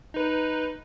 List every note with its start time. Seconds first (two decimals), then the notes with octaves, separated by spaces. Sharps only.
0.14 D#4 B4